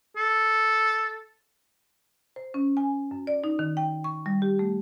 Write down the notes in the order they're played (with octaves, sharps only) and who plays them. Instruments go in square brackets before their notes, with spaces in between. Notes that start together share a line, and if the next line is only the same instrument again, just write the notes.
[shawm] A4
[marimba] C5
C#4
G#5
F#2
D5
D#4
D#3
G5
C#6
G3
G4
A3